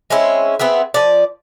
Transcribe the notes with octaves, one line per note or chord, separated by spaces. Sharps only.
G#3 C4 C#4 E4
B3 C4 G#4 E5
F3 D5